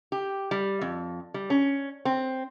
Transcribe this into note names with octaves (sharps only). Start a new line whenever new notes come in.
G4
G3
F2
G3
C#4
C4